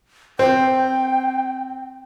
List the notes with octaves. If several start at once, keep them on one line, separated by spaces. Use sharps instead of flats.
C4 G5